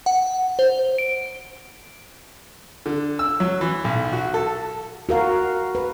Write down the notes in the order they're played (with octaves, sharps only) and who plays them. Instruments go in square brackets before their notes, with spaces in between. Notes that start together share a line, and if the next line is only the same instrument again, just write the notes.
[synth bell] F#5
C5
D7
[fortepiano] D3
E6
F#3
E3
B1
F#4
A4
[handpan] F#4 A#4 F5
B4